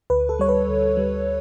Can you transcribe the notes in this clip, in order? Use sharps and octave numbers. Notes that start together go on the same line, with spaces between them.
D2 B4
A4
G3 C#5
B4
D2
G3